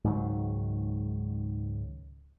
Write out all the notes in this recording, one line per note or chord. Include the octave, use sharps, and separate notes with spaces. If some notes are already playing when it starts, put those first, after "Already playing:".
C#2 G#2 D#3 F#3